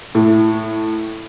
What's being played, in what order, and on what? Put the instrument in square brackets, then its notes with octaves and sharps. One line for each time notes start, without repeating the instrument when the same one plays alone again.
[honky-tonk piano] A2